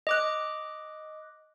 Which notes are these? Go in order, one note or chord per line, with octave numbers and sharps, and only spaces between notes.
D#5 D6 F#6